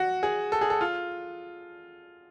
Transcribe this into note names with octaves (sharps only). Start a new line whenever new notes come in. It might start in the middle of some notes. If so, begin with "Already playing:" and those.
Already playing: F#4
G#4
A4
G#4
A4
F4